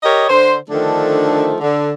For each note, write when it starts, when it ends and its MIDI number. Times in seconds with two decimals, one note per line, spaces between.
0.03 0.26 67
0.03 0.26 70
0.03 0.26 73
0.03 0.26 75
0.30 0.54 50
0.30 0.54 72
0.70 1.57 50
0.70 1.57 51
0.70 1.57 53
0.70 1.57 57
0.70 1.57 62
1.60 1.90 50